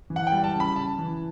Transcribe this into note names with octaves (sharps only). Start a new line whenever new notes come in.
E3
F#5
G5
G3
A5
C#3
B5
C#3 A5
E3